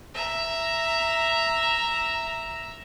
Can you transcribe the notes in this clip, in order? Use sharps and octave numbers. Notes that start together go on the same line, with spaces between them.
E5 A#5